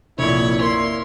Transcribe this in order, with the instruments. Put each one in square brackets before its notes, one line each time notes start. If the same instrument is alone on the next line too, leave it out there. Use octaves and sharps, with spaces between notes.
[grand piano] F1 A#1 [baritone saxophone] E4 [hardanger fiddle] C#5
[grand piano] A#3 [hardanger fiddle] C6